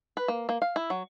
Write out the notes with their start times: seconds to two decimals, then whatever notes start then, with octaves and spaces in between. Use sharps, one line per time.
0.17 B4
0.28 A#3
0.49 A#3
0.62 F5
0.76 E4
0.90 F#3